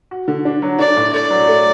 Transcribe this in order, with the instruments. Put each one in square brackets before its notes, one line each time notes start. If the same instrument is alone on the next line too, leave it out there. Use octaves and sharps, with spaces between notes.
[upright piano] F#4
D3
D4
F#3
[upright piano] D4 [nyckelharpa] D5
[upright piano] A2
[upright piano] A3 [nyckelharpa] D5
[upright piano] F#3
A3